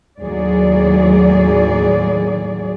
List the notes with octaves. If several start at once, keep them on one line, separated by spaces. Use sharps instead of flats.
D#2 A2 F#3 G#4 D5